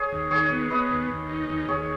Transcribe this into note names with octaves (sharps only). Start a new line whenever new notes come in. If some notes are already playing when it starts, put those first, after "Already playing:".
Already playing: G#4 C#5
D#2
D#3 G#4 C#5
B3
B3 B4 D#5
D#2
D#2
D#4
D#2
D#2 G#4 C#5